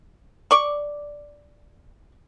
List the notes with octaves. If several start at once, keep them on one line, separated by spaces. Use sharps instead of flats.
D5 C#6